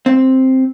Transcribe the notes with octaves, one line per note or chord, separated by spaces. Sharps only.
C4